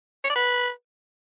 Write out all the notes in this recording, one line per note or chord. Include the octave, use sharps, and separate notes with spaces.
C#5
D5
B4